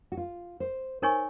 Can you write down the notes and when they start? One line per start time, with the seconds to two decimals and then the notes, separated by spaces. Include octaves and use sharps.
0.12 F#4
0.17 F4
0.60 C5
1.02 D#4 A#4 C5 C#5 G#5 C#6